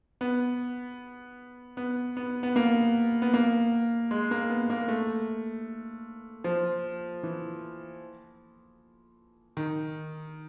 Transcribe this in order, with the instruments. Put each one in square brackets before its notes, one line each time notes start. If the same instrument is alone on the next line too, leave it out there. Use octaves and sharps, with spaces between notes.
[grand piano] B3
B3
B3
B3
A#3
B3
A#3
G#3
A#3
B3
A#3
A3
F3
E3
D#3